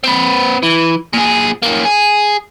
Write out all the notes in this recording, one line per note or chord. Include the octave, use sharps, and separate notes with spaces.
C4 B4
E3
A#2 G#4
A#3 C#4
G#4